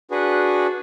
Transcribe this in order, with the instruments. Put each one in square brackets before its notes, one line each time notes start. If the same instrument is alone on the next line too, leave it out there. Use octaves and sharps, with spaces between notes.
[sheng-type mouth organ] D4 F#4 G#4 B4